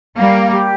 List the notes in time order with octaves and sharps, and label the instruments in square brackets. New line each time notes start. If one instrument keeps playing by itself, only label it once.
[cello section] G3 A#3 [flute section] F5
[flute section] G4